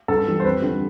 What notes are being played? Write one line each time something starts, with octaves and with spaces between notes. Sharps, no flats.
G2 A4
E3 G3
C5
F2 B4
D3 G3